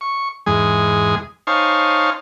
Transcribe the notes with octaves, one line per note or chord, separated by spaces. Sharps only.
C#6
E2 G#2 G#3 G#4 G#5
D#4 C5 C#5 F5 G#5 A5